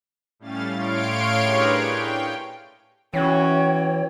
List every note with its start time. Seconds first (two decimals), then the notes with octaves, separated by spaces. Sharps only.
0.39 A2 G3 A3 C#4 F5 A6
0.75 A2 C#5 F5 C6 D7
1.41 D4 G4 G#4 A#4 B4 C#5
1.75 G5
3.14 E3 C#4 F#4 C#5 G5